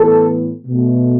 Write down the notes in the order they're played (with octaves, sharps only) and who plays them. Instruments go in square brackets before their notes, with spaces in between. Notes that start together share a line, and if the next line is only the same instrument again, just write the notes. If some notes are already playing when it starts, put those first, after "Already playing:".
Already playing: [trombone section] A2 E3 B3 A4
B2 A3